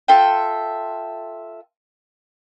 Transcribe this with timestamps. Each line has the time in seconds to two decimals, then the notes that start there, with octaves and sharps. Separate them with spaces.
0.08 F4 A4 E5 G5